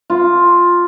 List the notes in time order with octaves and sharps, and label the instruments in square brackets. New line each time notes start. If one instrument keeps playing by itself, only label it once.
[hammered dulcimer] F4